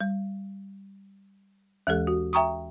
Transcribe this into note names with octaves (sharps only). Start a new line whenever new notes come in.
G3
D#2 E3 G#3 G4 A4
F#4
E5 G5 A#5 C#6 D#6